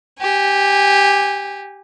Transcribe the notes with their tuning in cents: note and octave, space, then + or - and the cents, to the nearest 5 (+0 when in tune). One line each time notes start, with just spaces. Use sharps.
G4 +0 G#5 -25